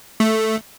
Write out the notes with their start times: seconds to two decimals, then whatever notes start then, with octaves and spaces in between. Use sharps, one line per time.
0.20 A3